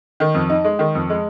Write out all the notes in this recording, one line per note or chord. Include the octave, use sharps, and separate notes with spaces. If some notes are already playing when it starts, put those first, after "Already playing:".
D#3
F2
D#4
G#3
D#3
F2
G#3